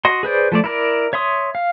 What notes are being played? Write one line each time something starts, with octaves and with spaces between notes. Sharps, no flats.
F#4 D#5 C6
G#4 B4 C5 D5
F3 A3 D5
E4 A#4 D5
C#5 E5 C6 D#6
F5